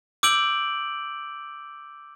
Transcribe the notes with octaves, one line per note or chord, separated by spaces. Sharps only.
D6 E6 G6 D7 F#7